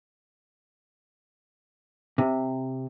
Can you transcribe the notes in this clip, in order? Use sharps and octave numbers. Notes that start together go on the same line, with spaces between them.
C3